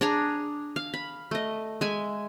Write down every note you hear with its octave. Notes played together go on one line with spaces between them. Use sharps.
D4 G#4 A#5
F5
B5
A3 D#5
G#3 E5 G#5